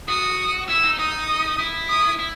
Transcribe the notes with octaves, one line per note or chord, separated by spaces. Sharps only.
F#4 D#6
E4 E6
D#4
D#4 D#6
E4
D#6
E4